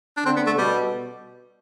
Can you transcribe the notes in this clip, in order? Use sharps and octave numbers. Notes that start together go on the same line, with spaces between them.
D4
D3 C4
B3
A3
B2 G3